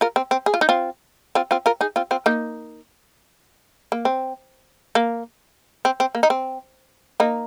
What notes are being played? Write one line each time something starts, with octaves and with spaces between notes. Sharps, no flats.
F4 A#4
C4
C4
G#4
F4
D#4
C4 F4
C4 F4
C4 F4
F4 A#4
D#4 G#4
C4 F4
C4 F4
A#3 D#4
A#3
C4
A#3
C4
C4
A#3
D#4
C4
A#3 D#4